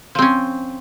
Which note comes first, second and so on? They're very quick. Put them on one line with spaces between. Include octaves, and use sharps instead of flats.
F3 C4 C#4